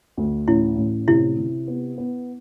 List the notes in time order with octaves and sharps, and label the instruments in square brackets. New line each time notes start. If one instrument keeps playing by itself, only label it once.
[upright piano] D2
[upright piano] A1 [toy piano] E4
[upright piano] A1
[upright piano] C3 [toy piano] E4
[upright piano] C3
B3
B3